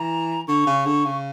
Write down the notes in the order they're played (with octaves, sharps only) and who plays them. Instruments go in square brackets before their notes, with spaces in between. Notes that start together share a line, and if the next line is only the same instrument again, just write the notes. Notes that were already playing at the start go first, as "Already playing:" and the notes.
Already playing: [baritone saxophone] E3 [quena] A#5
[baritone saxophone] D3 [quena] C#6
[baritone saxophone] C#3
D3
C#3